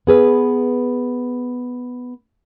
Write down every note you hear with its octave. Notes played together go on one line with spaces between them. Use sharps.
B3 G#4 B4